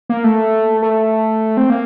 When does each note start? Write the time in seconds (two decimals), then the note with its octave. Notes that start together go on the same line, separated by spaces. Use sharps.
0.09 A#3
0.24 A3
0.82 A3
1.57 C4
1.70 A#3